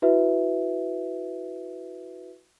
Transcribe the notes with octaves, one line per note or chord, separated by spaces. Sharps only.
E4 F#4 B4 E5